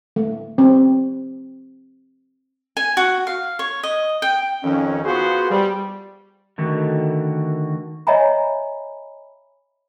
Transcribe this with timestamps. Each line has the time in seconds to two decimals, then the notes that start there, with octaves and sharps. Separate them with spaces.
0.16 A3
0.58 C4
2.77 G#5
2.97 F#4
3.27 F5
3.59 C#5
3.83 D#5
4.22 G5
4.63 F2 D#3 C#4
5.04 B3 F4 F#4 G#4 C5
5.50 G3
6.58 D3 D#3 A3 F#4
8.07 C#5 D#5 E5 G#5 A#5 B5